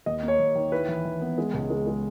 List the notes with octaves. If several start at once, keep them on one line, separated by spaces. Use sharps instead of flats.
D#2 D#5
A#3
C#5
D#2
D#3
E4 B4
E3
E3
B3
G#3
C#2
G#3
G#3